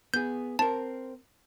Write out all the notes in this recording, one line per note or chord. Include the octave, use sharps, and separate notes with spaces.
B3 G#4 G6
C4 A#4 A5